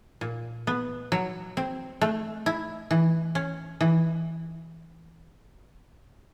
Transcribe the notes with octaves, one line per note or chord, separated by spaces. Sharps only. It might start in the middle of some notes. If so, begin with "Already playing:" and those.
A#2
B3
F#3
C4
A3
E4
E3
C#4
E3